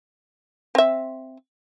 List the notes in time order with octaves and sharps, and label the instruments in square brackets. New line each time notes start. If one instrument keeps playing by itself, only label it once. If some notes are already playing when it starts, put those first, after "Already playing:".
[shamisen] C4 E5